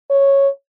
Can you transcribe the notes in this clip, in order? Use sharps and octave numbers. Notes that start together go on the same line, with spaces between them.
C#5